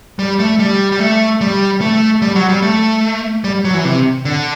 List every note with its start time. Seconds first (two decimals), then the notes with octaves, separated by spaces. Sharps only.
0.19 G3
0.39 A3
0.59 G3
0.92 G3
1.00 A3
1.41 G3
1.81 A3
2.22 G3
2.36 F#3
2.49 G3
2.62 A3
3.44 G3
3.64 F#3
3.74 E3
3.85 C3
4.25 D3